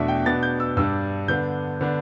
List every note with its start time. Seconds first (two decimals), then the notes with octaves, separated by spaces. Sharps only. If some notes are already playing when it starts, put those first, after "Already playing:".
Already playing: E2 B2 A3 D4 E5
0.08 G5
0.26 B2 B3 D4 A6
0.43 G6
0.60 E6
0.77 G2 G3 D4 E6
1.28 D3 B3 D4 G6
1.81 D3 B3 D4